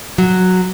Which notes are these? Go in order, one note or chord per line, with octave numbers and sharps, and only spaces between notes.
F#3